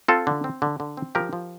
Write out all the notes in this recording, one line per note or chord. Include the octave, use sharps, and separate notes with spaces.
C4 F4 A4
D3
C4
D3
D3
C4
F3 G4 A#4
F3